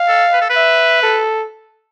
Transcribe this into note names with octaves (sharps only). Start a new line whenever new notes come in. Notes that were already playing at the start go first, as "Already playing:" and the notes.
Already playing: F5
A4
B4
A4
B4
E5
A4